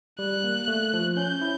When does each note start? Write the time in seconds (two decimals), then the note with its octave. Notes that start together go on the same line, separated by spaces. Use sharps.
0.19 G3 F#6
0.44 A#3
0.68 A3
0.93 F3
1.17 C#4 G6
1.41 E4